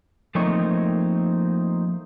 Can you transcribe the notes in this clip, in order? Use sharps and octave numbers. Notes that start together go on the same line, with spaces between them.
F3 A3 A#3 C4 D#4 C#5